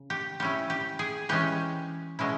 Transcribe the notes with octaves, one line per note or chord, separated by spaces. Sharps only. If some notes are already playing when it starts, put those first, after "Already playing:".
Already playing: C#3
G4
G3 C#4 E4 G4
G4
G#4
E3 G#3 C#4 G4
B2 G#3 C#4 E4